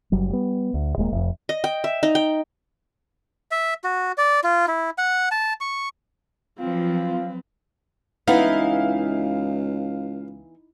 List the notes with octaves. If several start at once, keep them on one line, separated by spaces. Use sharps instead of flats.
F#1 F#3 G3
G3 B3
D2
D#1 G#3 A#3
F1 F2
D#5
G5
E5
D#4
G5
E5
F#4
D5
F4
E4
F#5
A5
C#6
F3 F#3 C4 F4 B4
C#2 E3 B3 D#4 E4 F5